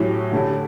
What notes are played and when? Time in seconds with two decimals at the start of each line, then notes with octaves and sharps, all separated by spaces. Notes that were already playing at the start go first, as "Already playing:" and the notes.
Already playing: A2 F#3 C#4 G4
0.32 D3 A3 C#4 E4 G4